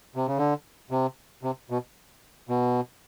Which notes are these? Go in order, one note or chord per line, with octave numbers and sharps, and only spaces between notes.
C3
C#3
D3
C3
C3
B2
B2